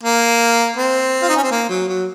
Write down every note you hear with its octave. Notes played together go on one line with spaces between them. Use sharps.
A#3
C4
F4
D#4
C#4
C4
A#3
F#3
F#3